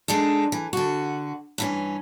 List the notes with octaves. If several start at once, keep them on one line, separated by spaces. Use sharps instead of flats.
G#3 D4 D#4 A4
E3
D3 F#4
G2 E3 C#4